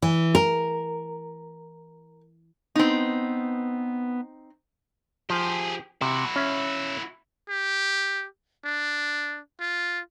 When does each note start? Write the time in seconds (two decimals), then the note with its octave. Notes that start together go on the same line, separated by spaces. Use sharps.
0.02 E3
0.35 A#4
2.76 B3 C4 D#4
5.30 F3 G4 G#4
6.01 C3 E4 F#4
6.36 C#4 E5
7.49 G4
8.65 D4
9.60 F4